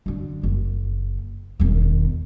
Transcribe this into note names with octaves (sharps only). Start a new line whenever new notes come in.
F#2 D3
F#1
E1 D#3